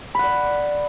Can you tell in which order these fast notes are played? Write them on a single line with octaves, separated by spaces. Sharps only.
B5 F#5 D5